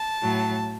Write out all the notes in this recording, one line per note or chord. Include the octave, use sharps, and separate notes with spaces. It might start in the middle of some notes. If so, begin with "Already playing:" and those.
Already playing: A5
A2 F#3